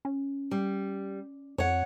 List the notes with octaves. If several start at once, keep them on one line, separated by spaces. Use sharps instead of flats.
C#4
G3
F2 C#5 F#5